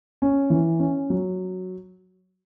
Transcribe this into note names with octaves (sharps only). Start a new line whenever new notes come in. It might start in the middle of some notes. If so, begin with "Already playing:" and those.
C#4
E3
C#4
F#3